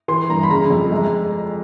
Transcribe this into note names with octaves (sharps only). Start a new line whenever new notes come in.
E3 C6
G2 A#5
B5
C#3 A#5
F2
G#3